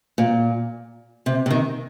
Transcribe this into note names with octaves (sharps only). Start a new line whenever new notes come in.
A#2
C3
C3
D#3